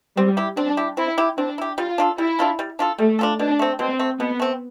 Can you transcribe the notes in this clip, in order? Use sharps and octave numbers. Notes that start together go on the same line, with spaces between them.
G3 C4
E4 G4
C4 D4
E4 G4
C4 E4
E4 G4
C4 D4
E4 G4
G3 F4
D4 F4 A4
G3 E4
D4 F4 A4
G3
D4 F4 A4
G3 A3
D4 F4 A4
B2 D4
A3 C4
B2 C4
A3 C4
B2 B3
A3 C4